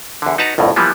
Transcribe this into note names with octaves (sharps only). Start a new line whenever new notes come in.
E2 D3
D#4 F#4 B4 A5 A#5
G1 C2 F2 A2
E3 F3 G3 A#3 B3